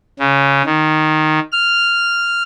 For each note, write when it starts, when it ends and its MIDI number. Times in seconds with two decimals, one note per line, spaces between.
0.19 0.63 49
0.66 1.39 51
1.52 2.43 89